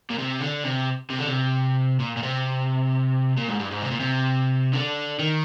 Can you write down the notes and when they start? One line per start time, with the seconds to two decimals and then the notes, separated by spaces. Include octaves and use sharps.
0.10 A#2
0.19 C3
0.40 D3
0.64 C3
1.10 C3
1.19 D3
1.27 C3
2.00 A#2
2.17 A#2
2.23 C3
3.37 A#2
3.48 G#2
3.59 G2
3.71 G#2
3.82 C3
3.91 A#2
4.00 C3
4.73 D3
5.19 D#3